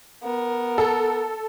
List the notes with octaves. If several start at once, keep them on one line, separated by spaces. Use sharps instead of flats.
B3 A#4
A4